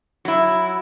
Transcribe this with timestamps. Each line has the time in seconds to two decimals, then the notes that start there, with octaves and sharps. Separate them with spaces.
0.25 F#3 E4